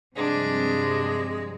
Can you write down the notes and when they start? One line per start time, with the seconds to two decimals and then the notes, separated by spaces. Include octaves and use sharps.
0.17 G2 C3 F3 G#3 D4